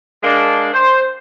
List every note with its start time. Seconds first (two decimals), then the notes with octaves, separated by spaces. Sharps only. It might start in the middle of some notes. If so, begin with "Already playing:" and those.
0.23 G#3 A#3 D4
0.74 C5